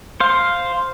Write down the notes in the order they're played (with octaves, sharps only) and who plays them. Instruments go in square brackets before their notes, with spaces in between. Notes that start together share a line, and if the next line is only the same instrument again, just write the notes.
[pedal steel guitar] C5 F5